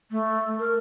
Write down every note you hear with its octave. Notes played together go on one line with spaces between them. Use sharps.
A3
A#4